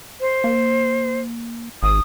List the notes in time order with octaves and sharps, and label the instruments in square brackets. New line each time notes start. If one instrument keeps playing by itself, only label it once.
[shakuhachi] C5
[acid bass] A#3
[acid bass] G#1 [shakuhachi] D#6